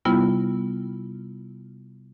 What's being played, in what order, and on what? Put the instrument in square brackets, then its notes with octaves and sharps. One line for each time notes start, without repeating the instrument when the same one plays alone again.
[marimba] C3 G3 B3 E4 F4